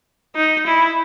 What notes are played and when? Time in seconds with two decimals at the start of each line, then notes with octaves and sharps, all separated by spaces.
0.36 D#4
0.66 E4